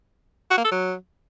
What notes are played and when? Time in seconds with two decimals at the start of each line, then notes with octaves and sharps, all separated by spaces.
0.51 F#4
0.58 A#3
0.65 A4
0.72 F#3